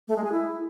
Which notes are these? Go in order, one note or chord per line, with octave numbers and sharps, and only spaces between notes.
A3
G#3
G#4
E4